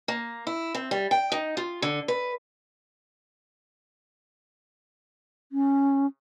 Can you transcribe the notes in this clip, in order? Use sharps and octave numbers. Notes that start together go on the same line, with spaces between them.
A#3
E4
C4
G3
G5
D#4
F4
D3
B4
C#4